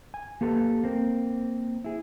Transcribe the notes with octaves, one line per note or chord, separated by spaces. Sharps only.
G#5
A#3 G4 A4 B4 G#5 A5
A#3 C4
E4 G#4